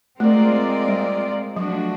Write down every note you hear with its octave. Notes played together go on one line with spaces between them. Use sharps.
G#3 A3 C4 F4 A#4 D5
G3
F3 F#3 A3 D4 F#4